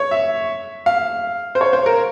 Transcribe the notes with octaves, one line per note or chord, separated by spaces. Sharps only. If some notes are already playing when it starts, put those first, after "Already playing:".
Already playing: C#5
E5
F5
C5
C#5
C5
A#4